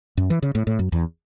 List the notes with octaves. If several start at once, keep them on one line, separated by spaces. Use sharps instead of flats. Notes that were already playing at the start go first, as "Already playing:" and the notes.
F#2
E3
C#3
A2
A2
F#2
E2